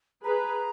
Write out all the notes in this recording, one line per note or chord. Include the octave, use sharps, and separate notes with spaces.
G#4 B4 A#5